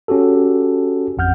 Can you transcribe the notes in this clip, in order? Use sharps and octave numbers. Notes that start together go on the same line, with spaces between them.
C#4 F#4 G4 A4
A1 F2 F#5 F6 G6